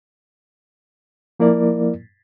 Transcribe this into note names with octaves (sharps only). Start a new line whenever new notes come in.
F3 A#3 E4 A#4 D5